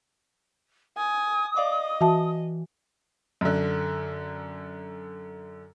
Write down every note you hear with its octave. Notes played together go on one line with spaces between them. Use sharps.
G#5 D#6
D5 D#5 F5 D6
E3 F#4 E5 A5
F#2 D3